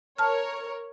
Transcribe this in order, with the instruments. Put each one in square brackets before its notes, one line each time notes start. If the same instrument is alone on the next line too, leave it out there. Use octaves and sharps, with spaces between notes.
[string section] A#4 C#5 [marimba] A5 F6